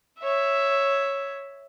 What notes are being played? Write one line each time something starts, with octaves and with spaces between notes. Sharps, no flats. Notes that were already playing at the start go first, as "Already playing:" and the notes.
C#5 E5